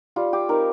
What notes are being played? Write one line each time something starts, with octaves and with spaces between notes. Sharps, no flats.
G3 F4
G4
C4 D#4 A#4